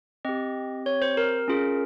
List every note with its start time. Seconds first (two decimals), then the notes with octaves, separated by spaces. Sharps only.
0.25 C4 G4 D#5
0.86 C#5
1.02 C5
1.17 A#4
1.48 C#4 F4 G#4